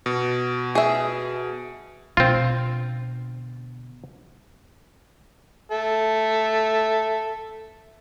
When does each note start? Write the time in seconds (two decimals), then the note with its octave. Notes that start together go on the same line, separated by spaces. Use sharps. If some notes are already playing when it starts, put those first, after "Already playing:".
0.06 B2
0.75 G#4 E5
2.17 B2 D3 C4 F4
5.71 A4 E5